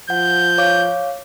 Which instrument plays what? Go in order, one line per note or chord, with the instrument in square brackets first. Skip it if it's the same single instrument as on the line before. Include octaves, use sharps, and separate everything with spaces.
[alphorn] F3 [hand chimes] F#5 [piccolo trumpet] G6
[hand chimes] C#5 F5 D6